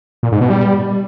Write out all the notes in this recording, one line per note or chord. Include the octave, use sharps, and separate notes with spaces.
A#2
G#2
B2
G3